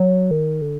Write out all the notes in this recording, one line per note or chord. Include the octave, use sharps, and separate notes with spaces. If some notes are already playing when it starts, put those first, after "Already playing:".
Already playing: F#3
D#3
D3